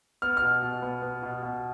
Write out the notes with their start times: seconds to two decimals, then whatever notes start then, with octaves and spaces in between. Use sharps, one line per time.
0.22 B3 F6
0.37 B2 F6
0.62 B2
0.82 B3
1.02 B3
1.23 B2
1.43 B2